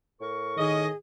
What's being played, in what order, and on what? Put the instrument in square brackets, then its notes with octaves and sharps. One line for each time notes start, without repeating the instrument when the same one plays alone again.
[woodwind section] A2 A#4 C#6
[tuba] D#3 [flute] G#4 [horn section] D#5